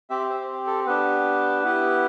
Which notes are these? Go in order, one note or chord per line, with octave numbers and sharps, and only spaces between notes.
C4 G4 E5
C5
A4
B3 D4 G4 B4
B3 E4 G4